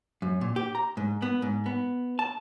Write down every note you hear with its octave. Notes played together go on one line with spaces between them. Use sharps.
F#2
A#2
G4
A#5
G#2
B3
G#2
B3
A5